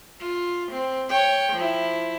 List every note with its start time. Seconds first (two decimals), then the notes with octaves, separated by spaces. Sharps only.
0.20 F4
0.71 C4
1.10 C#5 G5
1.53 F3 E4